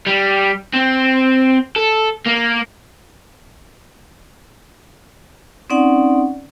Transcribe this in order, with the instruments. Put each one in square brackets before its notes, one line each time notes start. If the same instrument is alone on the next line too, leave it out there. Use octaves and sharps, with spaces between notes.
[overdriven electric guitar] G3
C4
A4
A#3
[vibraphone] C4 C#4 D#4 D5 F#5